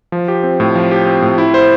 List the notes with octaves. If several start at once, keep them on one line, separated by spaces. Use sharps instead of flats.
F3
G4
C4
A2
F3
G4
C4
A2
E4
C5